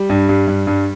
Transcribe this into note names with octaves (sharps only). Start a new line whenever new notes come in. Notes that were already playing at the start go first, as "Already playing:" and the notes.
Already playing: G3
G2
G2
G2
G2